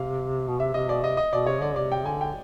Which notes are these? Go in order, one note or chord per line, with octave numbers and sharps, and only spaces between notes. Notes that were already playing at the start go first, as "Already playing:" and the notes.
Already playing: C3 F5
B2
C3 E5
C3 D#5
B2 D5
C3 D#5
D#5
B2 D5
C3 C#5
D3 D5
C3 D5
G5
D3 G#5
G5